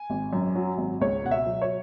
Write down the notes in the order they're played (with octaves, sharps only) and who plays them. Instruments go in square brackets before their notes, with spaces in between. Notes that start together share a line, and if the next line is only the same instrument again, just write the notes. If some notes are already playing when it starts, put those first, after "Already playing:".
Already playing: [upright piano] G#5
G#1
F#2
F#3
G#1
C#2 C#5
B2 F#5
E5
F#3
C#5